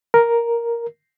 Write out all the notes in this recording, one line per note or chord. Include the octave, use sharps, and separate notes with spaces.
A#4